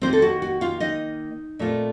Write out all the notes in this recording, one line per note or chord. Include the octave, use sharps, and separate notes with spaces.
D#3 A#3 C4 F4 C5
A4
F#4
F#4
F4 F5
D#4 D#5
A#2 A3 C4 F4